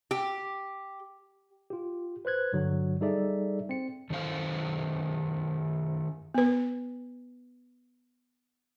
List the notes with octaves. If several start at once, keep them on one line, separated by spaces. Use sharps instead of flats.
G4
F4 G4
B4 C5 F#6 G#6
G2 D3 F#3
G3 D#4 G#4 A4 D5 E5
C4 C#7
F#2 D#3 C#4 A4 C5 F5
B3 B4